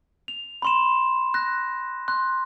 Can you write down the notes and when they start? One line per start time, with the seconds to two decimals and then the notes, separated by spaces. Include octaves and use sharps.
0.28 F7
0.62 B5 C6 E7
1.34 F#6 A#6
2.08 C6 F#6